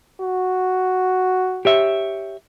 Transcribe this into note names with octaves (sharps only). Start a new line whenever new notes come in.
F#4
G4 C#5 E5